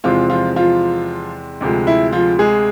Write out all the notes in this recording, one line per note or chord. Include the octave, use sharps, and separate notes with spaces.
E2 C3 E3 F3 G#3 C4 F4
F3 F4
F3 F4
D2 C3 F3 G#3
E4
F3 F4
G#3 G#4